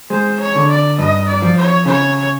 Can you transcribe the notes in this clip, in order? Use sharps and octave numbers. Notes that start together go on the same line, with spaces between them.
G#3 C5
C#5
D3
D5
G2 D#5
D5
F3
C#5
C#3 C#5